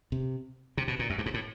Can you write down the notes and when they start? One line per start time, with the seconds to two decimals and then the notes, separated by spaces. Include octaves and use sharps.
0.12 C3
0.77 C3
0.88 B2
0.99 A#2
1.10 F#2
1.18 G2
1.26 G#2
1.34 A2